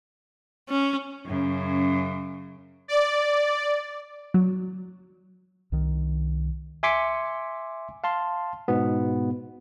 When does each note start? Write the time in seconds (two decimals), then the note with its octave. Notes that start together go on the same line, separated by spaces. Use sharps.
0.69 C#4
1.26 F#2 C#3
2.88 D5
4.34 F#3
5.72 C2 D#3
6.83 E5 G#5 C6 D6 B6 C#7
8.04 F5 A5 C6
8.68 G#2 B2 B3